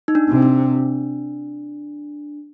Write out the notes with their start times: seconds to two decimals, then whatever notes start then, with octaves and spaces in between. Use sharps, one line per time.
0.08 D#4
0.15 D4
0.29 C3
0.42 D4